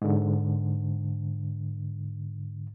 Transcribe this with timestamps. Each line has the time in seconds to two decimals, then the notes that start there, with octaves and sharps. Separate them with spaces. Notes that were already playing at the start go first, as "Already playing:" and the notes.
0.02 G#2 D3